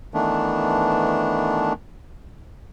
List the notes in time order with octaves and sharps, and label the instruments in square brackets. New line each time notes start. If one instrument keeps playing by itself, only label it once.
[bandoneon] D#3 E3 A3 B3 D4